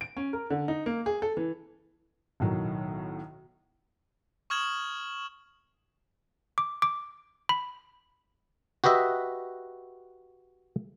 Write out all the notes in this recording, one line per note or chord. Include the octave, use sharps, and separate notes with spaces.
D7
C#4
A#4
D3
D#4
A#3
G#4
A4
E3
B1 A2 D#3 F#3
C#6 D#6 F6 G#6 E7 F#7
D6
D6
B5
F#4 G4 B4 D#5 E5